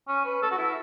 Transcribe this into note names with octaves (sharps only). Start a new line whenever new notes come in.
C#4
B4
A4
F#4
E4